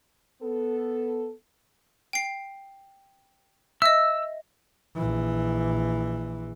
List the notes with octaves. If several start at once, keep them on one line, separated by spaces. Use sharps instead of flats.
B3 A4
G5 C7
D#5 E5 E6
A#1 E3